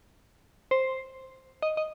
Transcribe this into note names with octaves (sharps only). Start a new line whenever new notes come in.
C5
D#5
D#5